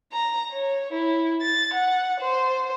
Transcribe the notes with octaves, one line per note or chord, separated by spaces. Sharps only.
A#5
C#5
E4
A6
F#5
C5